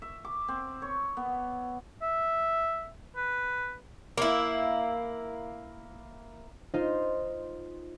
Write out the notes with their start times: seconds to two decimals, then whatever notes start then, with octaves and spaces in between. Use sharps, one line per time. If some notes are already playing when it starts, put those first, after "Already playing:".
0.02 E5
0.25 D6
0.48 C4
0.82 C#5
1.17 B3
2.02 E5
3.17 B4
4.18 A#3 E4
6.74 D#4 F4 C5